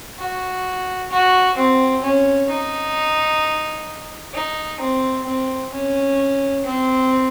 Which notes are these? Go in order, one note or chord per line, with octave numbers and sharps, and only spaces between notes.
F#4
F#4
C4
C#4
D#4
D#4
C4
C4
C#4
C4